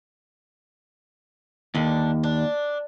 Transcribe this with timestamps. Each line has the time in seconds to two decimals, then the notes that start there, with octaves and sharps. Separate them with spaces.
1.75 D#2 D3 D4
2.23 D4